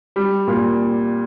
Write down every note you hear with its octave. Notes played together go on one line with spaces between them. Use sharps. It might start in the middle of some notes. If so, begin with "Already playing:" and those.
G3
A#2